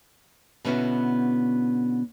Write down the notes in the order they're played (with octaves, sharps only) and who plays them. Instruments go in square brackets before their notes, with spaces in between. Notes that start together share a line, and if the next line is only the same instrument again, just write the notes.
[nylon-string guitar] B2 D3 B3 C#4 E4 F#4